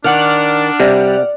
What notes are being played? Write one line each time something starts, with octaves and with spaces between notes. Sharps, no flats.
D#3 D4 D5 F#5 F6
C3 G3